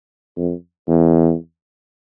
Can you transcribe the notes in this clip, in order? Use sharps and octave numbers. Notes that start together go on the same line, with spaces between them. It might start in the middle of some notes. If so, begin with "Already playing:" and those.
F2
E2